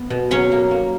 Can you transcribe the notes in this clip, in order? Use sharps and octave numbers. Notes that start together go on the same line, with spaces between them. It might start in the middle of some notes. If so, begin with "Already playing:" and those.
Already playing: B3
B2
F#3 C#4 C#5
A#3
A#3